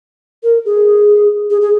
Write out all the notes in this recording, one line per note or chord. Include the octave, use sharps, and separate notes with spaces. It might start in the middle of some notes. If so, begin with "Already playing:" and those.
A#4
G#4
G#4
G#4